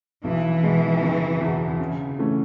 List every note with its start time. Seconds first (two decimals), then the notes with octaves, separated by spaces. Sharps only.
0.24 B1 E3
0.62 B2 G#3
1.02 F#1
1.41 E2 B2
1.79 C#3
2.18 E3 A3 C#4